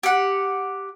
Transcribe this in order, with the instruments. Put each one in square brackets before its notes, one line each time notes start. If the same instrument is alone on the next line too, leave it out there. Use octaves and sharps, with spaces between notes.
[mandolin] G4 F#5